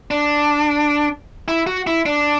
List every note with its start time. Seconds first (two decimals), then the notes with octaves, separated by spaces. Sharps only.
0.11 D4
1.48 E4
1.67 F#4
1.87 E4
2.06 D4